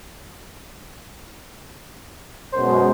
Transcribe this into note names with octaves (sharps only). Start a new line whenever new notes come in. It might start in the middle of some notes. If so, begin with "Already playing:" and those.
F#2 B2 G#3 C5